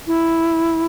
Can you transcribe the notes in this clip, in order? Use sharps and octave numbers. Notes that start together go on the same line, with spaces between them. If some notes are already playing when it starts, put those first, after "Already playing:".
E4